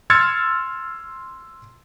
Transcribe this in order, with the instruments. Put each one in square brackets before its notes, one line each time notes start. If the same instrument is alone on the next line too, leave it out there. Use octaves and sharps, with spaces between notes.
[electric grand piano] C6 E6 F6 G#6 A6 C#7